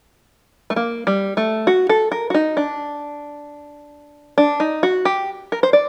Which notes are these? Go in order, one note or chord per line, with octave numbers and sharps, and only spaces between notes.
A3
A#3
G3
A3
F#4
A4
A#4
F#4
D#4
D4
D4
D#4
F#4
G4
A#4
C5
D5